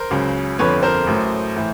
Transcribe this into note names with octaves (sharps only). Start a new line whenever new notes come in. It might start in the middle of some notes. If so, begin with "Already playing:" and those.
Already playing: A#4 C5
C#2 C#3 F#3
G1 F2 D3 F3 B4 C#5
A#4 C5
A1 A2 F#3
A2 E3